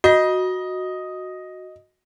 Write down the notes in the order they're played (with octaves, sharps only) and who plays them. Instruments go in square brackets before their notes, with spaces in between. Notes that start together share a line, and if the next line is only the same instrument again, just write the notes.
[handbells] F#4 [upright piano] D#5